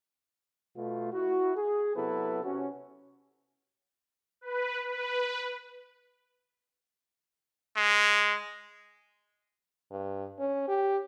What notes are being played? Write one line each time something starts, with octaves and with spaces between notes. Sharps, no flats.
B2 A3 F4
E4 F#4
G#4
C3 F#3 B3 E4 A4 B4
C3 C#4 F#4
B4
B4
G#3
G2
C#4
G4